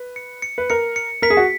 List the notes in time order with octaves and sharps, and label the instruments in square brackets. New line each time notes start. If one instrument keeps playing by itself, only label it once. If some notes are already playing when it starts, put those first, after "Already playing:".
Already playing: [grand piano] B4
[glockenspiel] C#7
C#7
[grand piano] B4
[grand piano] A#4 [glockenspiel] C#7
[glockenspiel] C#7
[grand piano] A#4 [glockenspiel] B6
[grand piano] G#4
F#4